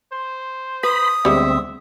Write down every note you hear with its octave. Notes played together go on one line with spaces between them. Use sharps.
C5
B4 B5 D#6
D2 G3 G#3 B3 C4 E5